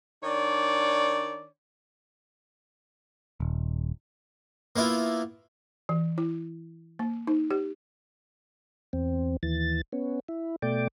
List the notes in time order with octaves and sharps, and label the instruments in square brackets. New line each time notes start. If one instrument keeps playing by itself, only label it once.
[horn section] D#3 D4 C#5 D5
[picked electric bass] D#1
[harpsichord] A#3 B3 E4 F4
[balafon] E3
E4
A#3
D#4
G4
[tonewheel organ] E2 C4
D#2 E3 A6
B3 C#4
E4
B2 A3 D5 G5 D6